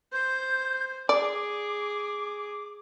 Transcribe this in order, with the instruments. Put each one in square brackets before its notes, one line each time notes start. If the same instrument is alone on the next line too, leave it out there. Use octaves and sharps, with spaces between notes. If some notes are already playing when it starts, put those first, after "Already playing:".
[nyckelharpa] C5 [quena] G6
[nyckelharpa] G#4 [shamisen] D5 [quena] D6